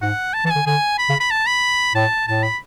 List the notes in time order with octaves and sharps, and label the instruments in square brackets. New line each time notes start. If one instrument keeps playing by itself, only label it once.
[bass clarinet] G#2 [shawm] F#5
[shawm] A5
[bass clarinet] E3 [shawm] A5
[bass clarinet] D3 [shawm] G#5
[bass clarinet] D3 [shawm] G#5
[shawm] B5
[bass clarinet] C#3
[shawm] B5
A5
B5
[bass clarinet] A2 [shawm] A5
[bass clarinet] A2 [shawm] A5
[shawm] B5